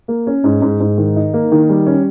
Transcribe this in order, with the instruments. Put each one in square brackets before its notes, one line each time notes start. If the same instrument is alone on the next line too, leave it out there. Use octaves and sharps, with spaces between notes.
[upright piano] A#3
C#4
G#2
G#2
G#2
D#3
D#4
A#3
D#3
G3
C#4